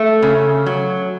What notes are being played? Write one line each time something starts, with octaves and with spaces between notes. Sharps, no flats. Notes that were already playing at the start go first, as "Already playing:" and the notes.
Already playing: A3
C#3
F#3